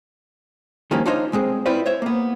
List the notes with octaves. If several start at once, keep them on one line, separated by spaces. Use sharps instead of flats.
D#3 F3 G3 A#3 C#4
D4 D#4 F4 C5 C#5 D#5
B1 G#3 C4 G#4
C4 E4 F4 B4 C5 D5
C5 C#5 E5
A#3 B3